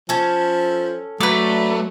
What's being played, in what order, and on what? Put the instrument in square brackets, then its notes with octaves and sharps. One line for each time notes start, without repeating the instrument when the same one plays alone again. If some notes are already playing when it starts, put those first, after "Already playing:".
[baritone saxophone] F3 [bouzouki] C#4 A4
[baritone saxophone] F#3 [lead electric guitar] A3 [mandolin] B4 D5